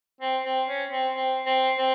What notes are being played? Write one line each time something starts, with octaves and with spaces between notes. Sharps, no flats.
C4
C4
C#4
C4
C4
C4
C4